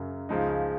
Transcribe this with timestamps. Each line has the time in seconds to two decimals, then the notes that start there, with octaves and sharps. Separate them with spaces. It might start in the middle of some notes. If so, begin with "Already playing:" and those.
Already playing: F#2 C#3 F#3
0.29 C#2 C#3 F3 G#3 D#4